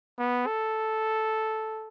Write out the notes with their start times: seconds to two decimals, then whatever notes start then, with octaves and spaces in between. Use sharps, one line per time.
0.19 B3
0.46 A4